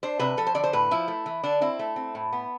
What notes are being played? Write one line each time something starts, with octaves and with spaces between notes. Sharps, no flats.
D4 C5
C3 B4
F3 A4
C5
D3 D5
C5
A2 B4
F3 E4
A3
E3
D3 D4
C4 E4
A3
C4
A2
B3